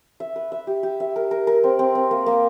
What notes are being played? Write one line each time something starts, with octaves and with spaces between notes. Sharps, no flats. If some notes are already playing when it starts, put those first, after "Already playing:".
E5
B4
E5
G4
G4
E5
A#4
A#4
A#4
C4
C4
C4
A#3
A#3